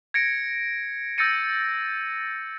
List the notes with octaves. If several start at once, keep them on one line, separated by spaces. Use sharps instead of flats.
G#6 A#6 C#7 D7
E6 G6 A6 A#6 C#7 D#7